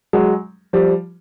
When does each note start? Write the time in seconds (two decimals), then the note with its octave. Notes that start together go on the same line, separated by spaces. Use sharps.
0.13 F#3 G#3
0.73 F3 G3